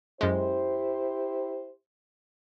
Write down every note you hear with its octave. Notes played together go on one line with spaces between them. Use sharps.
F#2 G#3 E4 G4 C5